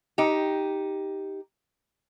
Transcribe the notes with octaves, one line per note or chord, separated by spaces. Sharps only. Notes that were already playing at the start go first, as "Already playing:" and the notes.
D#4 G4